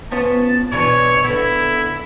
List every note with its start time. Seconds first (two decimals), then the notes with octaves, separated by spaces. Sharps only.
0.11 B3 C#4 F4 A5
0.72 B2 E3 D4 C#5
1.24 D3 B3 E4